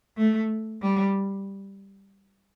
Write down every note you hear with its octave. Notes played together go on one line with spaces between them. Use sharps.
A3
G3